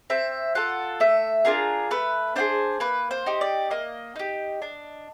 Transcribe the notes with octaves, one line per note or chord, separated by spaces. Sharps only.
C4 E5
F4 A4 F#5
A3 E5
D4 F4 G#4 A#4
A3 B4
D4 F4 G#4 C5
A#3 B4
C5
D#4 G4
D5
A#3 D#5
D#4 G4
D4